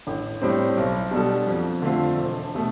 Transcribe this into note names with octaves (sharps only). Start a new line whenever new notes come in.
A1
A2 G3 C4
B1
B2 G3 D4 A4
F2
D3 A3 C4 F4
E1
B2 A3